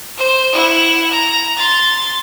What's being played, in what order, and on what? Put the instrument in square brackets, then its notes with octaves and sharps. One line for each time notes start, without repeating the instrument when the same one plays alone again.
[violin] C5
E4 F#5
A#5
C6 A6